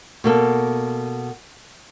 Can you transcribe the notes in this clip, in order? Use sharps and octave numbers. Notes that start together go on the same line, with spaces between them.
B2 A#3 A4